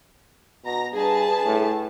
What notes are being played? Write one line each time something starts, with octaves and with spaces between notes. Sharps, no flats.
B2 A#5 A#6
G2 G#4 B4 A5
A2